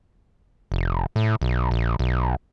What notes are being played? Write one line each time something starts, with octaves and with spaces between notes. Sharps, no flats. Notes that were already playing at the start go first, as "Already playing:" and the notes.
F1
A2
B1
A#1
B1